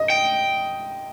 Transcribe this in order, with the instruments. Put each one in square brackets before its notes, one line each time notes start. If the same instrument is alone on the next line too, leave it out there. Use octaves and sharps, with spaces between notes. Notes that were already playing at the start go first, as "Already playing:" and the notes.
Already playing: [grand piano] D#5
[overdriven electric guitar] G5